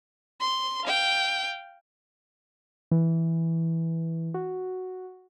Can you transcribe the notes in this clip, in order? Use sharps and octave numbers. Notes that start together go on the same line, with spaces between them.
C6
F5 G5
E3
F#4